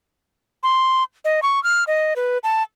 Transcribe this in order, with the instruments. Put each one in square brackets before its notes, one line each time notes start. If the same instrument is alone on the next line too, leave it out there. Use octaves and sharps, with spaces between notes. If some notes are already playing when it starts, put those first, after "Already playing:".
[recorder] C6
D#5
C#6
F6
D#5
B4
A5